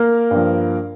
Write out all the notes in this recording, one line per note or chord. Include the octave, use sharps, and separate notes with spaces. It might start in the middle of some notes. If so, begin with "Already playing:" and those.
Already playing: A#3 A#4
G2 F3